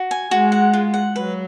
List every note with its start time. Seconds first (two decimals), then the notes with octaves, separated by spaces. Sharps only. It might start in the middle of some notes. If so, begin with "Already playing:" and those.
Already playing: F#4
0.11 G#5
0.31 G#3 F#4
0.52 F#5
0.73 F4
0.94 F#5
1.15 F#3 B4